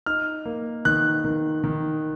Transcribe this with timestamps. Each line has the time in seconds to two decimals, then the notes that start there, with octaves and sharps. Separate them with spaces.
0.06 D#4 F6
0.45 A#3
0.85 D#3 F#6
1.25 D#3
1.64 D#3